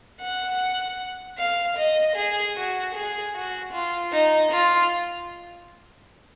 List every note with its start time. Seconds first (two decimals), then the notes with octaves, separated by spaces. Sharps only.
0.21 F#5
1.38 F5
1.77 D#5
2.16 G#4
2.56 F#4
2.95 G#4
3.35 F#4
3.73 F4
4.13 D#4
4.52 F4